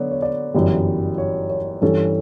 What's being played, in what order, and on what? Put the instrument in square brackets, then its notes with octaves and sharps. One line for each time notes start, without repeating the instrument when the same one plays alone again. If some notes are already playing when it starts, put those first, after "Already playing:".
Already playing: [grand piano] D3 F#3 B3 D5
C#5
D5
G1 F#2 E3 G3
C#5
C#5
G2 E3 G3 C#4 A4